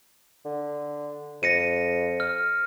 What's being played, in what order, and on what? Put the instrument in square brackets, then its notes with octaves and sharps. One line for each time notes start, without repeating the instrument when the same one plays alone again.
[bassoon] D3
[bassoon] F2 [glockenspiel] A#6 C#7 D#7
[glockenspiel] F6